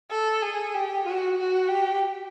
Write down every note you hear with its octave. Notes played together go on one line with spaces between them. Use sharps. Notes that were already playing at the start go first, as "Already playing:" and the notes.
A4
G#4
G4
F#4
F#4
G4